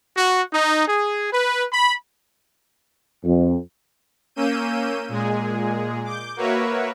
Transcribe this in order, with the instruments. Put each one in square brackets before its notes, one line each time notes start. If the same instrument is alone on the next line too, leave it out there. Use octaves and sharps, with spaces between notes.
[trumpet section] F#4
D#4
G#4
B4
B5
[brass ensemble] F2
[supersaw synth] A#3 C#4 E6 G6 D#7
A#2 G#3 G#4
D6 G6
A#3 F#4 A#4 B4 C#5 E5